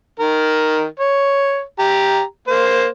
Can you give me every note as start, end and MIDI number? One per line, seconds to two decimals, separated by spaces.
0.20 0.86 51
0.20 0.86 70
1.00 1.62 73
1.79 2.22 67
1.79 2.22 82
2.48 2.86 58
2.48 2.86 72